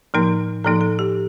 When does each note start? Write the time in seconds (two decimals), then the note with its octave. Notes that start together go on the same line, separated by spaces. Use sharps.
0.14 A2 F3 A#3 D#4 A#4
0.64 A2 F3 A#3 D#4 A4
0.81 A4
0.99 G4